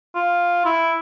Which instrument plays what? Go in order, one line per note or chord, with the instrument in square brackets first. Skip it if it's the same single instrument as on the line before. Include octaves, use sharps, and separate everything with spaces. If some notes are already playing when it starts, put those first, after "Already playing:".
[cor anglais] F4
E4